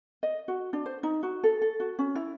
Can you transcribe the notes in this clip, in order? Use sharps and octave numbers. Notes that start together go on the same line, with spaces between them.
D#5
F#4
D4
C5
D#4
F#4
A4
A4
F#4
C#4
E4